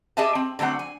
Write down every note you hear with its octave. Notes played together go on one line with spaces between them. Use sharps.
G4 G#4 D#5 E5 G#5 A5
C4
D3 F#3 A3 C4 F#5
G#5